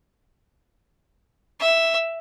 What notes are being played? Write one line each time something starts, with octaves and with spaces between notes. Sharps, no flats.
E5